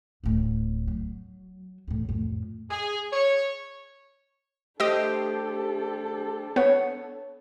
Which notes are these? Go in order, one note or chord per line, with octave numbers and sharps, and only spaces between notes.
D1 A2
F#3
E2 A2
F2 A2
G#4
C#5
A3 D4 G4 A4 C5 D#5 D#6
B3 C#5